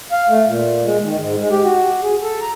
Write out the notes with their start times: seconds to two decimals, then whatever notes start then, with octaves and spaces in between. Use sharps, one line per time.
0.12 F5
0.29 A3
0.47 A#2
0.85 G#3
1.02 D#3
1.19 G#2
1.39 G#3
1.51 G4
1.64 F#4
2.02 G#4
2.22 A4
2.41 A#5